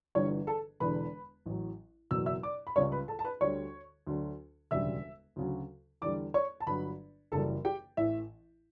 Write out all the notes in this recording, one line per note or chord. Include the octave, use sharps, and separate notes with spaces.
G1 G2 E3 G3 C#5 C#6
A4 A5
E1 E2 D3 B4 B5
A1 A2 F#3
F#1 E2 B2 F#3 E6
E5 E6
D5 D6
B5
C#2 C#3 G3 C#5 C#6
B4 B5
A4 A5
A5
B4 B5
D2 D3 G3 C#5 C#6
D2 D3 F#3
E1 D2 C#3 G3 E5 E6
D2 C#3 F#3
E2 D3 G3 D5 D6
C#5 C#6
A5
G1 G2 F#3 B4 B5
F#1 F#2 C#3 E3 G3 A4 A5
G4 G5
A1 A2 E3 E5